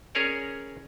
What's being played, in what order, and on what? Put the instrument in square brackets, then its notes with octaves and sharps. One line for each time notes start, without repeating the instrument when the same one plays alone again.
[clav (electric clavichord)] C#4 G#4 A#4 C#5 D5